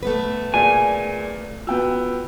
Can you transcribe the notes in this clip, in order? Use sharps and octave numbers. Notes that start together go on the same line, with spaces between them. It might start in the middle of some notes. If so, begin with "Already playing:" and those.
A3 B3 B4
A#2 G#4 D5 G#5
B3 F4 F#4 G5 E6